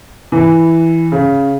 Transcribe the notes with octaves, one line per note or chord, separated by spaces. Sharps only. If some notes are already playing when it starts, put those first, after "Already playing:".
E3
C#3